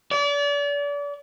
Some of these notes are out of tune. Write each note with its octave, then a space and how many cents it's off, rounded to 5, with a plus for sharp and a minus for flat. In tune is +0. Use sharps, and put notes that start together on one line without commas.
D5 -35